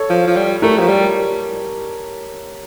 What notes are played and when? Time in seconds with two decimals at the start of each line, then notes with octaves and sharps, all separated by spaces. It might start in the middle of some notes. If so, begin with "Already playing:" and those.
Already playing: A4 C#5
0.10 F3
0.27 F3
0.36 G3
0.62 A3 G4 A#4
0.78 F3
0.89 G3